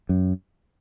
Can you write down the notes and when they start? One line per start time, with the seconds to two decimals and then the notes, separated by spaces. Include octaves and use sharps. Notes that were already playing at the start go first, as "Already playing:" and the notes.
0.09 F#2